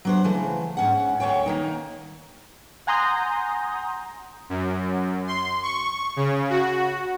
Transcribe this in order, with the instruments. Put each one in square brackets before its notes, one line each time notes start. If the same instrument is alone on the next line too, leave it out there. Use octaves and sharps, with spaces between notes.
[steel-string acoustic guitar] F#3 D4 C5
C#3 E3 A3
G#2 C#4 F#5
D2 G2 C#5 G5
D#3 A#3 D#4
[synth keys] F#5 G#5 A#5 C6 D#6 G6
[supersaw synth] F#2
C6
C#6
C#3
F#4